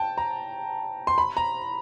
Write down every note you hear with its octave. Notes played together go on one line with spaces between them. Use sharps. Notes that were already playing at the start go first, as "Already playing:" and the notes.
Already playing: G5 A5
A#5
C6
B5
A#5